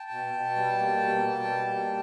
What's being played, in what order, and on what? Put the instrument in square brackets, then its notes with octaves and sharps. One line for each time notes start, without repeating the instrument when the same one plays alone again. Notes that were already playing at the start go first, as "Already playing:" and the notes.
Already playing: [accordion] G5 A5
B2
B2
G3
A#3
B2
B2
G3
A#3